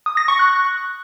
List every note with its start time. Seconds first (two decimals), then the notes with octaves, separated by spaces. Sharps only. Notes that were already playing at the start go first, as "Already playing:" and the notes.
0.06 D#6
0.17 A#6
0.28 C#6
0.39 F#6